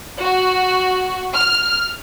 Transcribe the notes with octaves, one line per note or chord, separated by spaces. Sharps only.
F#4
F6